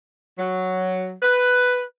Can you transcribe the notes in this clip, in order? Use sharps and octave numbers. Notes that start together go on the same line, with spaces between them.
F#3
B4